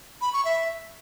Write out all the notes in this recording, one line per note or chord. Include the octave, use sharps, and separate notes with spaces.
B5
C#6
E5